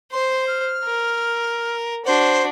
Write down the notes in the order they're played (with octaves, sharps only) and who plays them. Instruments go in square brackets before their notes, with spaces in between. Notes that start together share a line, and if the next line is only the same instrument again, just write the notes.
[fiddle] C5 [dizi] C6
[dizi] F6
[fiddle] A#4
[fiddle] D4 F#4 [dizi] C5